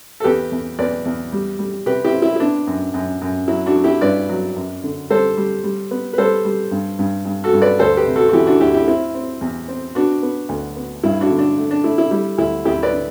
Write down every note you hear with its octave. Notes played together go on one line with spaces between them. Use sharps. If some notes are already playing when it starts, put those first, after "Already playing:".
A4
E2 G4 B4
E2
E2 B4 D5
E2
G3
G3
C3 G4 B4
E4 G4
C4
E4
E4
B3 D4
F#2
F#2
F#2
F#3 E4
D4 F#4
F#3
E4 G4
G2 B4 D5
F#3
F#2
D3
G3 A4 C5
G3
G3
B3
B4
G3 A4 C5
G3
G2
G2
G2
F#4 A4
G2
B4 D5
D2 A4 C5
G4 B4
C3
F#4 A4
F#4
E3 E4 G4
D4 F#4
D2 E4 G4
E4 G4
C4 E4
C4
E2
C4
B3 D4 F#4
B3
D2
B3
G2 E4
D4 F#4
D3
D4
A3
D4
A3 E4
E4
G3 E4
D2 E4
D2 E4 G4
B4 D5
D3